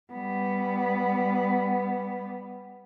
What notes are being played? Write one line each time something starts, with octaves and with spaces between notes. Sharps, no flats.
G3 B3